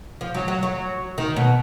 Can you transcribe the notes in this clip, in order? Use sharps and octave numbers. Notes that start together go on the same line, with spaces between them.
F3
F#3
F#3
F#3
D#3
B2